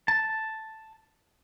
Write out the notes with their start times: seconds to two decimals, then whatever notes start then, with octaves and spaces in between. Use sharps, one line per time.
0.08 A5